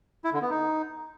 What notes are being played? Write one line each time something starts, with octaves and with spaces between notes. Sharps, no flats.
E4
D3
B3
D#4